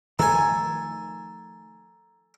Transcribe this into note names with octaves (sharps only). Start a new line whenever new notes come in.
D#3 F3 A3 A4 G#5 A#5